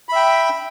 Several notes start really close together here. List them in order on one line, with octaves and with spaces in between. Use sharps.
B5 E5 G5